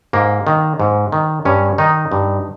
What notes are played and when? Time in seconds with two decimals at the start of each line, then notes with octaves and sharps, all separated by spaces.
0.13 G#2 A#3
0.47 D#3
0.80 G#2
1.12 D#3
1.45 G2 C#4
1.78 D#3 D#4
2.12 G2